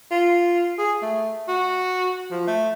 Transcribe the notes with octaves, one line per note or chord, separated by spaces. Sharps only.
F4
G#4
A3
F#4
F3
A3